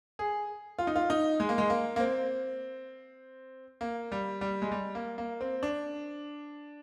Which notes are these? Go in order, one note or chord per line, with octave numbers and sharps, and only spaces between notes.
G#4
F4
D#4
F4
D#4
G#3
A#3
G#3
A#3
A#3
C4
A#3
G3
G3
G#3
G3
A#3
A#3
C4
D4